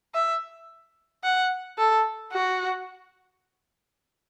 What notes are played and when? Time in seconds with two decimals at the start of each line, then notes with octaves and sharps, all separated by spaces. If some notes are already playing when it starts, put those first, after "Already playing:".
0.14 E5
1.24 F#5
1.78 A4
2.33 F#4